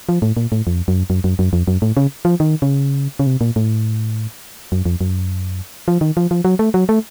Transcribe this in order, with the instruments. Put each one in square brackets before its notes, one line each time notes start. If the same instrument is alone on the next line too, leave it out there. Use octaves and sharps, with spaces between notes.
[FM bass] F3
A2
A#2
A2
F2
F#2
F#2
F#2
F#2
F2
F#2
A2
C#3
F3
D#3
C#3
C#3
C3
A#2
A2
F#2
F2
F#2
F3
D#3
F3
F3
F#3
A3
F#3
A3